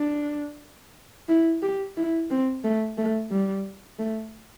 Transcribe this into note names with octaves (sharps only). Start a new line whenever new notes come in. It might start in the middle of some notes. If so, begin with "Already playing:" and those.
Already playing: D4
E4
G4
E4
C4
A3
A3
G3
A3